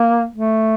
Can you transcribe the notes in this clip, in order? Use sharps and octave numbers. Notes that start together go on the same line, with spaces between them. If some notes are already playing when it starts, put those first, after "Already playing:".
Already playing: A#3
A3